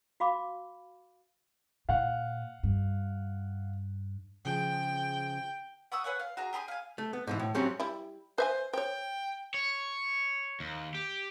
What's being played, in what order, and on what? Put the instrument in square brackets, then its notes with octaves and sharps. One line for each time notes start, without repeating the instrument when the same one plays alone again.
[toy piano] F#4 F5 B5 D6
[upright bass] A#2 [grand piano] F5 F#5
[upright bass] G2
[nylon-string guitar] C#3 F3 G#4 [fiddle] G5
[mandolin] F#5 C#6 D#6 E6
B4 C#5 F#5 G#5
F5
F#4 G#4 A#5
G4 G#4 A#5 D#6
F5 G#5
[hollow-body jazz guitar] A3
B3
G#2 B2 E3
A2
F#3 C4 C#4 F#4 G4 C#5
[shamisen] G3 E4
[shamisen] B4 E5 G#5 [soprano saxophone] C5
[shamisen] C5 C#5 [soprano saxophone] G5
[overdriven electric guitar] C#5
D#2
G4